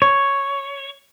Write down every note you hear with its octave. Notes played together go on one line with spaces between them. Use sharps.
C#5